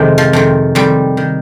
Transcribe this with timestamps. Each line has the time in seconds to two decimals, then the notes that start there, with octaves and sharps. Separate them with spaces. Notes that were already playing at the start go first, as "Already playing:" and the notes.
Already playing: F2 C3 D#3 G#3 C4
0.18 F3
0.33 F2 C3 D#3
0.75 F2 D#3 G3
1.17 D#3